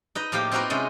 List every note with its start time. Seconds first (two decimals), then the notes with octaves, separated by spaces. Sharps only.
0.15 D#4 B4 D#5
0.32 A2 F3 A#3 G4 F5
0.51 C4 D#4 F4 F#4 A#4 B4
0.70 C3 G#3 C#4 D#5